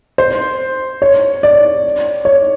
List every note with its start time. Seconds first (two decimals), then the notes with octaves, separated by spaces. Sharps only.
0.18 C5
1.02 C#5
1.43 D5
2.25 C#5